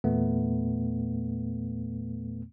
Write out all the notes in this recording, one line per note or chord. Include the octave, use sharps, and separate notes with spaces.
E2 A#2 A3 B3